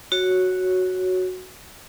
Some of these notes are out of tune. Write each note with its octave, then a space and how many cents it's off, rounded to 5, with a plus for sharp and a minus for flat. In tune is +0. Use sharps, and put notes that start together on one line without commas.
F#4 +0 C#5 +0